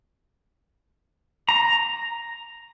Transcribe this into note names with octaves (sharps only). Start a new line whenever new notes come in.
A#5